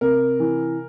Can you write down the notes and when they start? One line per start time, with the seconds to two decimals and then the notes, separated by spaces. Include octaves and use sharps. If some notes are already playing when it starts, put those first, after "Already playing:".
0.01 C3 A#4
0.40 E3